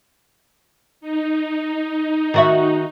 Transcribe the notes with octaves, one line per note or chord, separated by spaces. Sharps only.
D#4
D#3 D#4 F#4 E5